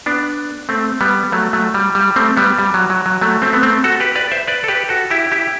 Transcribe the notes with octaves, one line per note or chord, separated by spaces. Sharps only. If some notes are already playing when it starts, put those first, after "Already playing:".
B3 D4
A3 C4
G3 B3
F#3 A3
F#3 A3
G3
G3
A3 C4
G3 B3
G3
F#3
F#3
F#3
F#3 A3
A3 C4
B3
A3 C4
F#4 A4
G4 B4
B4 D5
C5 E5
B4 D5
A4
G4 B4
F#4 A4
E4 G4
E4 G4